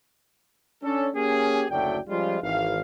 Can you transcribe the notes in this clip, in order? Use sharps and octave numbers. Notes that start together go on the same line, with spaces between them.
C#4 D4 A4
A#3 C#4 G4 G#4
F#1 D2 F#3 A3 D5 G5
F3 G3 G#3 C#4 F4
G#1 E3 F5